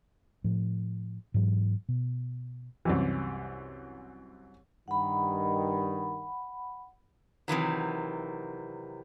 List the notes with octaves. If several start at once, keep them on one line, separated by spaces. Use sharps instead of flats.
A2 F3
G#2 E3 F#3
B2
C2 F#2 E3
G2 D#3 F#5 B5
C3 D#3 E3 F#3